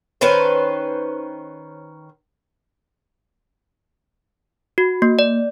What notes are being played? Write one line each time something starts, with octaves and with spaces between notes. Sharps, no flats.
D#3 C#4 B4 C5
F#4
A#3
D5